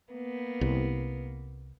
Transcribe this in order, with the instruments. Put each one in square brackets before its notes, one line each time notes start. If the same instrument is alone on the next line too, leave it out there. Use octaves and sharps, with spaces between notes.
[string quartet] A#3 B3
[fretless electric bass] C2